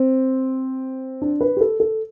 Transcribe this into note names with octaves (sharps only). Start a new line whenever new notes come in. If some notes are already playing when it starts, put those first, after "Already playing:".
Already playing: C4
D4
B4
G4
A4
A4